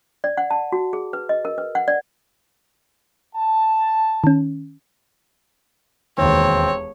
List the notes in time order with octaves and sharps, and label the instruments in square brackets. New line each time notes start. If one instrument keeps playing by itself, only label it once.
[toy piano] D5
F#5
A5
F#4
G#4
B4
D#5
A#4
B4
F#5
D5
[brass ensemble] A5
[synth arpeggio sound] D#3 C#4
[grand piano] E1 D#2 [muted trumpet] C4 [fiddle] C#5